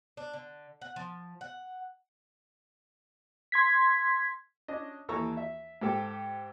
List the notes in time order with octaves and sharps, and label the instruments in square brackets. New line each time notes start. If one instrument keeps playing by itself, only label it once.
[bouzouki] D4
D3
F#5
F3
F#5
[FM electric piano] C6 G#6 B6
[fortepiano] C#4 D4 D#5
D#2 E3 A4 A#5 C#6
E5
G#2 G4 A4 G5